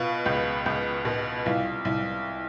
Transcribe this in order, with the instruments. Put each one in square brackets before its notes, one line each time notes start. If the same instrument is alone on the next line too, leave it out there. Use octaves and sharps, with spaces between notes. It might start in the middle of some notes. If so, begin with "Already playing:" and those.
Already playing: [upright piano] B2 F4
C#2
C#2
B2
C2 F4
C2